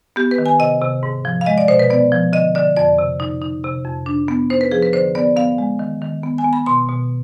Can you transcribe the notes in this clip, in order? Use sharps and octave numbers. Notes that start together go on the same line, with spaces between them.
B3 G4
B4
D#3
G#5
C3 D#5
C3
G#2
F3
F5
G#3 D#5
D5
B2 C5
B4
B3 D5
F3
D3 D#5
D3 D5
F2 D5
C3
D#4
D#4
C3
F2
D4
B3
D#4 C5
B4
F3 G#4
B4
D3 C5
B3 D5
B3 F5
G#3
D#3
D#3
B3
G#5
B3
B5
B2 C6
B2